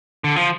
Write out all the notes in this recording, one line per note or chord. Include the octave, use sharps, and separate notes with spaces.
D3
F3